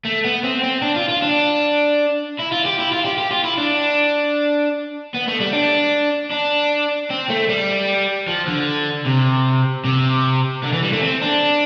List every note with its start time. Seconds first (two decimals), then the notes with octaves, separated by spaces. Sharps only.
0.05 A3
0.25 B3
0.44 C4
0.64 C4
0.82 D4
0.96 F4
1.09 F4
1.22 D4
2.40 E4
2.52 F4
2.66 G4
2.79 E4
2.92 F4
3.05 G4
3.18 G4
3.31 F4
3.44 E4
3.58 D4
5.14 B3
5.27 A3
5.40 G3
5.53 D4
6.32 D4
7.10 C4
7.30 A3
7.49 G3
8.27 F3
8.47 D3
9.06 C3
9.85 C3
10.63 D3
10.73 E3
10.83 G3
10.93 A3
11.02 C4
11.22 D4